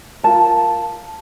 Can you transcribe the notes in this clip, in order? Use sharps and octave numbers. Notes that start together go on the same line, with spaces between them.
F4 A#4 A5